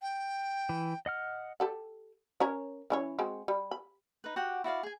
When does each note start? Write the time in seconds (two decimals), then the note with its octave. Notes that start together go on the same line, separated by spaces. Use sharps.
0.02 G5
0.69 E3
1.06 D#5 F#5 F6
1.60 G4 A4 F#5
2.40 C#4 A#4 C#5
2.90 E3 C#4 C#5
3.18 G#3 C4 F#4
3.48 G3
3.71 B5
4.24 D#4 B4
4.36 F#4 G4 F#5 G5
4.64 E4 F#4 D5 F5
4.83 G#4 G#5